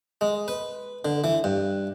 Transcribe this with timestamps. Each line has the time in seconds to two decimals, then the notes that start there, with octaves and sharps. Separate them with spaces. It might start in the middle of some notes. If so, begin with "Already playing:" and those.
0.21 G#3
0.48 B4
1.05 D3
1.24 E3
1.44 G2